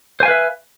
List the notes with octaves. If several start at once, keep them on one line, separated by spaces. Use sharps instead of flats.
B4 C5 E5 F5 G#5